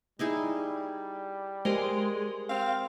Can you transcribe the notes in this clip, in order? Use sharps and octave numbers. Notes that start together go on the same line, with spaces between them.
G3 D#4 E4 G#4
G#3 G4 A#4 C5 D#5
C4 F5